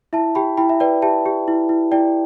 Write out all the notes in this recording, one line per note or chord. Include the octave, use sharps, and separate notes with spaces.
E4 E5 A5
G4 G5 B5
E4 G5 B5
E5
B4 D5 G5
G4 E5 A5
G4
E4
E4
E4 D5 G5